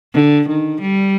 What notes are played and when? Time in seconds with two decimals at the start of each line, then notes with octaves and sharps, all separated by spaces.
0.14 D3
0.48 D#3
0.81 G3